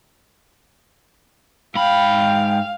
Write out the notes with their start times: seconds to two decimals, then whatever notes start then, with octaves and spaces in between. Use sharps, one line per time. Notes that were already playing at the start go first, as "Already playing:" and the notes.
1.75 G#2 F5 G5 B5